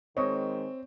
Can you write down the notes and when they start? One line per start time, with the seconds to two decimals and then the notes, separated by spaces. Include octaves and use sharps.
0.17 D#3 G#3 C4 C#5 D#5